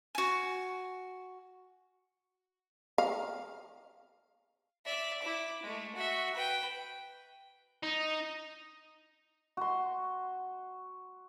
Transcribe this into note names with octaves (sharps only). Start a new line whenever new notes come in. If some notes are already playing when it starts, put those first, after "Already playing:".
F#4 G#5
F5
D5 E5
E4 D6
G#3 A3
F#4 E5
B4 G5
D#4
F#4 C6